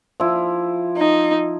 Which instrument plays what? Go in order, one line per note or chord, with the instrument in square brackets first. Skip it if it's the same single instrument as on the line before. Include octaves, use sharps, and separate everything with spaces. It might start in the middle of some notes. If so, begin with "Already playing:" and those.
[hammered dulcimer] F3 E4
[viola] D#4